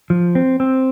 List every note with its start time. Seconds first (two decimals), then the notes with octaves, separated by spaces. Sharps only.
0.10 F3
0.35 C4
0.60 C4